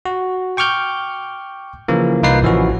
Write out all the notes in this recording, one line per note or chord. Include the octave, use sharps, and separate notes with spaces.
F#4
G5 C#6 D6 F6 G6
C#3 E3 F3 A#3
C2 A#3 D#4 F4 B4 C7
A1 E3 F3 C#4 F#4